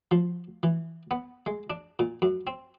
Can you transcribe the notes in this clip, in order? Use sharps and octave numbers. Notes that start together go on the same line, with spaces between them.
F3
E3
B3
G#3
D4
A#2
F#2
C4